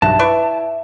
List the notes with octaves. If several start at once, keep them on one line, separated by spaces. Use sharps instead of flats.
B1 G2 F#4 E5 A5
E4 B4 D5 C#6